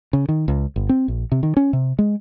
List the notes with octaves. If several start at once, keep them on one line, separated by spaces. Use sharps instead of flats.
C#3
D#3
C#2
G1
C4
A#1
C3
D#3
C#4
C3
G#3